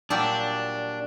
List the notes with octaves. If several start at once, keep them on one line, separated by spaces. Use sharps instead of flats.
A#2 F#3 G3 D4